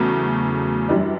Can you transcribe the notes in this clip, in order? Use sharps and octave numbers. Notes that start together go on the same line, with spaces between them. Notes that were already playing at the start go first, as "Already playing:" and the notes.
Already playing: E2 C#3 F#3 A3
F#2 E3 G3 D4